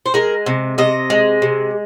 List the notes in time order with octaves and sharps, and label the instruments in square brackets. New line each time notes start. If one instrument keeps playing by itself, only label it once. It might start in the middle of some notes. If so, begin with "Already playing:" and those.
[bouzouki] C5
G#3 A#4
C3
C3 D#5
G#3
C3